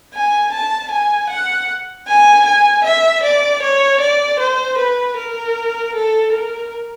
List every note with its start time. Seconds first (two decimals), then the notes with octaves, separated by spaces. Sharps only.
0.14 G#5
0.52 A5
0.91 G#5
1.30 F#5
2.07 G#5
2.45 G#5
2.84 E5
3.23 D5
3.63 C#5
4.01 D5
4.40 C5
4.78 B4
5.17 A#4
5.95 A4
6.32 A#4